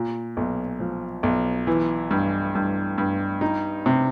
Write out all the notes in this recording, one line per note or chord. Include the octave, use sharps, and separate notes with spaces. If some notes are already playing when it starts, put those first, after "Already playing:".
Already playing: A#2
B1
F3
B1
E3
G2
G2
G2
D#4
C3